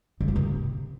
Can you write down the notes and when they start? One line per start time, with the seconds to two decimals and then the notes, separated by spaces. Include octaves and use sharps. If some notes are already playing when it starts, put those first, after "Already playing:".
0.20 C#3
0.28 F4
0.36 C3